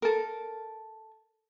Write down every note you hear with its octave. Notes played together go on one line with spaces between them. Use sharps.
A4 A#4